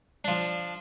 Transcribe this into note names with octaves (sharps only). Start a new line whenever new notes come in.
F3 D4